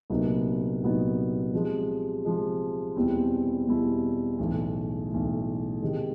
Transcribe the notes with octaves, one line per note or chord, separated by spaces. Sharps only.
C2 A#2 F#3 B3 D#4
C2 A#2 F#3 B3 D#4
C3 F3 G#3
C3 F3 G#3
E2 B2 G3 C4 E4
E2 B2 G3 C4 E4
B1 A2 E3
B1 A2 E3
C3 D#3 G#3 C4